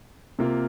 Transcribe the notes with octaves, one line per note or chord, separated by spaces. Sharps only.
C3 A#3 F4